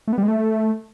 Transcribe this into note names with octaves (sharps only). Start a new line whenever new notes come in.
A3
B3
G3
G#3
A3